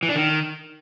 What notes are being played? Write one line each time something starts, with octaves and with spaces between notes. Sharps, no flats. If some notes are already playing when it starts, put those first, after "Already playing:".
E3
D4
D#3